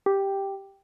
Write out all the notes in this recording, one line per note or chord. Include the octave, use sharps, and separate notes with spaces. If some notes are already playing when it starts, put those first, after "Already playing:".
G4